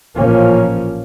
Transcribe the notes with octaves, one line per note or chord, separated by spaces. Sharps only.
A1 A#2 F3 A#3 C#4